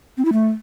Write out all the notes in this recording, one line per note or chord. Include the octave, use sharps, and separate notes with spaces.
C4
E4
A3